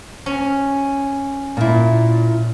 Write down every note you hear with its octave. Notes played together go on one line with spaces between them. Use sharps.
C#4
A#2 E4